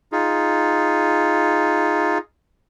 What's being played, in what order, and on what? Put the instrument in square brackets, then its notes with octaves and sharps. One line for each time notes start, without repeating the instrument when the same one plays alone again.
[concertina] D#4 F4 G#4